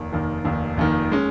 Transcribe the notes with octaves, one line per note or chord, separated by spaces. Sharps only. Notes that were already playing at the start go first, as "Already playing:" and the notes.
Already playing: F1 D#2 D#3
F1 D#2 D#3
F1 D#2 D#3
F1 D#2 D#3
G#3 C#4